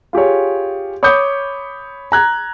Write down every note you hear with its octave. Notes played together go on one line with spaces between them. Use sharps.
F4 G4 G#4 C#5
C#5 B5 D6 D#6 G6 C#7
A#5 F#6 G#6